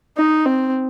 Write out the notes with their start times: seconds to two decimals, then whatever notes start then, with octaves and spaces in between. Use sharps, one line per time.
0.17 D#4
0.45 C4